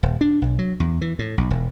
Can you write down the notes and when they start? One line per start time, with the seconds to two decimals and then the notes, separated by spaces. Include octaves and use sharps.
0.03 D#1
0.21 D4
0.42 B1
0.59 F#3
0.80 E2
1.01 E3
1.19 A2
1.38 B1
1.51 E1